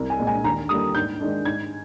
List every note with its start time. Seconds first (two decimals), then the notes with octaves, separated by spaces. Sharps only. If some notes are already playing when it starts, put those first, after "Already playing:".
Already playing: C2
0.10 G#5
0.19 A#2 G#3
0.27 G#5
0.44 D#2 A#5
0.69 D3 G3 A#3 D#6
0.95 G#2 G6
1.20 D#3 G#3 D4
1.45 G#2 G#6